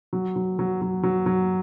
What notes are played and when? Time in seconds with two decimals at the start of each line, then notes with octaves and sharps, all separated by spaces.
0.13 F#3
0.36 F#3
0.59 F#3
0.82 F#3
1.03 F#3
1.26 F#3